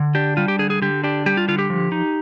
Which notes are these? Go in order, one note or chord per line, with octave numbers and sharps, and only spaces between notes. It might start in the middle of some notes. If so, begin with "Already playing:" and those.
Already playing: D3
D4 G4
G3 F4
G4
D3 G#4
G#4
D3 G4
D4 G4
G3 G4
F4
D3 F4
G4
F3
D#4